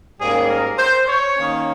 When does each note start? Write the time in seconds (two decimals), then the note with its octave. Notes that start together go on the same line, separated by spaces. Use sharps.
0.20 G#2 G3 A#3 C#4 G#4
0.49 A#4
0.78 C5
1.07 C#5
1.35 D#3 A#3 C#4